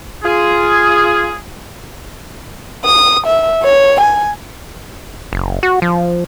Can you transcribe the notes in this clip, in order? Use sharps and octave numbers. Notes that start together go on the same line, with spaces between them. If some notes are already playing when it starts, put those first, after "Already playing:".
F4 G#4
D#6
E5
C#5
G#5
F#1
F#4
F3